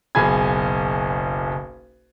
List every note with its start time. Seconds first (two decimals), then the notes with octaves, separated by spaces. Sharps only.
0.15 F#1 B1 G#4 G#5 B5 G#6